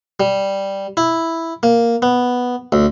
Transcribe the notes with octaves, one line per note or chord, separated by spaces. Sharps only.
G3
E4
A#3
B3
D2